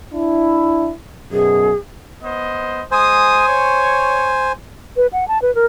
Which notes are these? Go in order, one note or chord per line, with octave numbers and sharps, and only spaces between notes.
D4 E4
F#2 B2 G#4
B3 C5 D#5
G#3 C5 G#5 D#6
C#5
B4
F#5
A5
B4
A#4